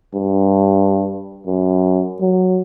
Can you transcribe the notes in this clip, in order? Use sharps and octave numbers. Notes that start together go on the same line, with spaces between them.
G2
F#2
F#3